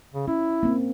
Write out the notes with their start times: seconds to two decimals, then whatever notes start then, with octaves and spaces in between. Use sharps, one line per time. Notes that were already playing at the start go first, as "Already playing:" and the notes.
0.14 C#3
0.28 C#4 E4
0.63 A#3 C4